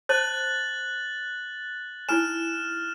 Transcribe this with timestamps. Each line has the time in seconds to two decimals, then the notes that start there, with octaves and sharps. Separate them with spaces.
0.09 C5 A5 F#6 A6 F#7
2.09 D#4 E4 G#5 F6 E7